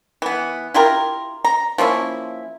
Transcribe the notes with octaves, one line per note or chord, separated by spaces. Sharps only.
E3 B3
E4 F4 G4 A#4
A#5
F3 A#3 C#4 E4